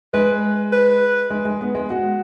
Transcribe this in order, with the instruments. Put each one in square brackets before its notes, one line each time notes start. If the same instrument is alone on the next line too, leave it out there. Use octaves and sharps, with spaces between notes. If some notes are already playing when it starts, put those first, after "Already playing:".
[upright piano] G#3 [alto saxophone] B4
[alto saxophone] B4
[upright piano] G#3
G#3
B3
G#3
F#4